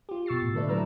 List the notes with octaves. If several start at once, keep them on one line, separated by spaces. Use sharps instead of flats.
F4 G4
B2 C#6 E6 A6 C7
A2
D3 A3 A4 B4 D5
F#3 G3 E4 B4 A#5 E6